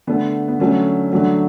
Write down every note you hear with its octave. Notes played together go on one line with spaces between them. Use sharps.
D3 A3 B3
B3
D3 F#3 A3 C#4
D3 F#3 A3